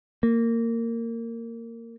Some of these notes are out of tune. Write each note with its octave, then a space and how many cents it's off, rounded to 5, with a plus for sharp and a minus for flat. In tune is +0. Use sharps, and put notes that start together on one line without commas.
A#3 -20